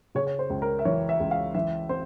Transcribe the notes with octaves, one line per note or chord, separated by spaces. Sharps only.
C#3 C#5
C#5
C5
C#2
A#4
E5
E3 C#5
E5
C#2
F5
E3 E5
C4 C5